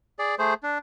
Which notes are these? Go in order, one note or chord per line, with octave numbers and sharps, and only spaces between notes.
G#4 D5
A3 G#4 C5
D4